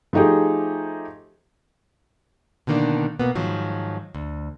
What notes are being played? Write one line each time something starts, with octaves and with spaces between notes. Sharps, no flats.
F3 A3 D#4 G4 G#4
B2 D3 D#3 A#3 D4
B2 A#3 B3
G#2 D#3 F3 F#3
D2